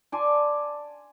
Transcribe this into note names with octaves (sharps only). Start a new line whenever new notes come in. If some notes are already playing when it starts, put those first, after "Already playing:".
D5 G#5 A5 C6